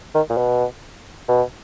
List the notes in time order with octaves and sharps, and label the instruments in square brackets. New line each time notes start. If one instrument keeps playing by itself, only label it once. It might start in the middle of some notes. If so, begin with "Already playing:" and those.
[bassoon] D#3
A#2
B2
B2